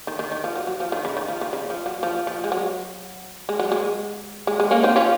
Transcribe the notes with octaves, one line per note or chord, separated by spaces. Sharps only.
D#3
D#3
D#3
F3
F#3
F#3
F3
D#3
C#3
D#3
F3
D#3
C#3
F3
F#3
F3
F3
G#3
F#3
G#3
F#3
G#3
G#3
G#3
A#3 C#4
C4 D#4
C#4 F4